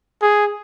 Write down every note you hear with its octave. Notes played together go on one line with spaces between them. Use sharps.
G#4